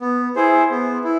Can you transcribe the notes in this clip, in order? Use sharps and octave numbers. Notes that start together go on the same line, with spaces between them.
B3
E4 G#4 C5
B3
E4